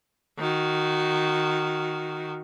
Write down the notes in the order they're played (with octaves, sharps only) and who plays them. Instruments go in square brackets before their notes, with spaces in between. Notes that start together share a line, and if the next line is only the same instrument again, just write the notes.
[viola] D#3 F#4